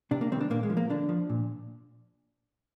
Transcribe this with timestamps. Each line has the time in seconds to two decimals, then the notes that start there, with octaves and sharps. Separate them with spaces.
0.11 C3 D4
0.21 A#3
0.32 D#3 G3 C4
0.40 D4
0.50 A#2 A#3
0.63 G#3
0.70 F3
0.77 A#3
0.90 D3 D4
1.09 F3
1.29 A#2